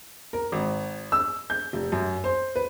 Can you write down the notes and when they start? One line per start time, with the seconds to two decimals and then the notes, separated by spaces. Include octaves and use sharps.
0.33 A#4
0.52 G#1
1.12 E6
1.50 G6
1.73 F1
1.92 F#2
2.24 C5
2.56 B4